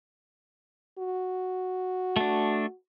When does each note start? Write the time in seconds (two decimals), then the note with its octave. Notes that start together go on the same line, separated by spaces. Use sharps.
0.98 F#4
2.16 A3 D4